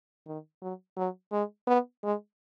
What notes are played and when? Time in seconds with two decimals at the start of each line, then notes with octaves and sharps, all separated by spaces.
0.26 D#3
0.62 F#3
0.97 F#3
1.32 G#3
1.67 B3
2.03 G#3